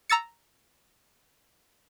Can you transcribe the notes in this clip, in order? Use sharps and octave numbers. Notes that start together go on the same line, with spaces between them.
A#5 E6 A6 C#7